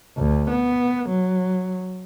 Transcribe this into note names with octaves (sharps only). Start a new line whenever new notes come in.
D2
B3
F#3